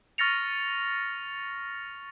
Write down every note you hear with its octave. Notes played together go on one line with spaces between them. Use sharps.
C#6 F6 A6 A#6 C#7 F7